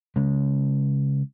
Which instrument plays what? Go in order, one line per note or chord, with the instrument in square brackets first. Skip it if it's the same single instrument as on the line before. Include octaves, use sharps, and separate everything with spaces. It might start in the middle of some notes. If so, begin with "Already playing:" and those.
[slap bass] C#3 G#3 C#4